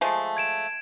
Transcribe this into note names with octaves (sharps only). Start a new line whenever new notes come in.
F3 G#3 A3
G#6 D7 E7